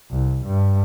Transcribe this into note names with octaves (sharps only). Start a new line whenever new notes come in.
C2
G2